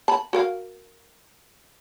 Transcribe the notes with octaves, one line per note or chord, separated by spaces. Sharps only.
A5 B5
F#4 A#4 F5